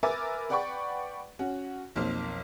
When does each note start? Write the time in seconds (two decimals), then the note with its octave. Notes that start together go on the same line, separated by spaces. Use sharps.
0.03 A#4 B4 E5 G#5 D6 A6
0.49 B4 D5 F#5 G5 B5 C#6
1.39 C#4 F#4
1.96 B1 F2 A#3 C5 F6